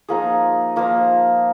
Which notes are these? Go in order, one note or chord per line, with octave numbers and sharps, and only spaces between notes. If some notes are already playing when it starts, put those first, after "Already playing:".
F3 A#3 D#4 G#4
F3 A#3 D#4